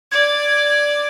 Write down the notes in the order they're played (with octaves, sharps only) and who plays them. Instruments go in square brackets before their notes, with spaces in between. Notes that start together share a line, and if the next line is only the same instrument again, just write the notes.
[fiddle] D5 [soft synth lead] G#6